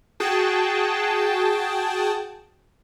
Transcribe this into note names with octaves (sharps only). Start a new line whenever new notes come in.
F#4 G#4 G5 A5